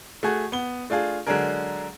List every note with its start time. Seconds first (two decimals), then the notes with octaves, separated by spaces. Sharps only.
0.23 A3 F#4 G#4
0.52 B3 G7
0.90 A3 D4 F4 G#4
1.27 D3 F#3 G#3 D4 G#4 A#4